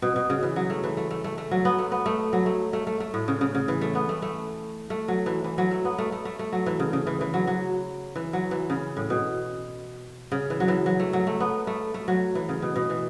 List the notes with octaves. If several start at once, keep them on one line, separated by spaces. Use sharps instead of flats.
B2
B2
C#3
E3
F#3
A3
E3
A3
A3
A3
A3
F#3
B3
A3
B3
A3
F#3
A3
A3
A3
A3
A2
C#3
C#3
C#3
E3
A3
B3
A3
A3
A3
F#3
E3
E3
F#3
A3
B3
A3
A3
A3
A3
F#3
E3
C#3
C#3
E3
E3
F#3
F#3
E3
F#3
E3
C#3
A2
B2
C#3
E3
F#3
E3
F#3
A3
F#3
A3
B3
A3
A3
F#3
E3
C#3
B2
B2
E3